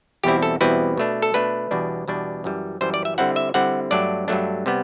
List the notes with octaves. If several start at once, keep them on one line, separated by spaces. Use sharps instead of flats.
E2 B2 G3 C4 E4 G4
A4
E2 B2 G3 C4 E4 B4
B2 A3 D4
A4
B2 A3 D4 B4
E2 B2 G3 D4
E2 B2 G3 D4
F#2 E3 G3
F#2 E3 G3 C5
D5
E5
D3 G3 C4 E4 F#5
E5
D3 G3 C4 E4 F#5
G2 F#3 A3 D4 D5
G2 F#3 A3 D4
C3 G3 B3